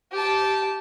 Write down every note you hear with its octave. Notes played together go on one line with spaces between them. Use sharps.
G4 A5